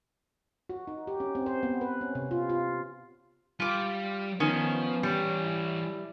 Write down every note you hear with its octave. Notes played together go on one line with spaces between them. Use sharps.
F#4
D#4
G4
C#4
C4
C5
B3
B4
C#4
C3
F4
F4
G3 F4 D6
D#3 F3 B3 C#4
E3 G3 C#5
E4